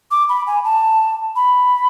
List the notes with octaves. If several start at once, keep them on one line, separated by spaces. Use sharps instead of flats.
D6
B5
G#5
A5
B5